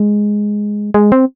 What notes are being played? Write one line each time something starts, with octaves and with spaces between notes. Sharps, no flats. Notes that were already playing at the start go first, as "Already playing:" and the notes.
Already playing: G#3
G#3
C4